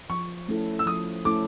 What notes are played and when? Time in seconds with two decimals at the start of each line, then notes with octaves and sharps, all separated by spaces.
0.10 F3 C#6
0.48 A3 C#4 E4 A4
0.79 E6
0.86 F3 D#6
1.25 A3 C#4 E4 A4 D6